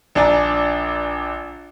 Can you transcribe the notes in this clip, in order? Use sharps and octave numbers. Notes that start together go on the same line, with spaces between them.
A#1 D4 D5 G#5 A#5